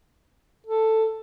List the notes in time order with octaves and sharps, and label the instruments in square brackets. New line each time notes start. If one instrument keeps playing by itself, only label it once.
[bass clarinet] A4